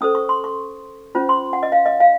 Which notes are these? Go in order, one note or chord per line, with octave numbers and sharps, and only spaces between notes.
C#4 A4 C5 D#6
C#6
C6
C#6
C#4 F4 C5
C6
F#5
D#5
F5
D#5
F5